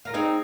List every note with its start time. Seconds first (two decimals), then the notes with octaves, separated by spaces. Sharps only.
0.05 F4 A#4
0.14 C4 D#4 G#4